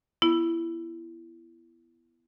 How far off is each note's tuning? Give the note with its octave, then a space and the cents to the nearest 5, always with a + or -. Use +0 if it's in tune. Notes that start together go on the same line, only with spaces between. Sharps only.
B3 +0 E4 +20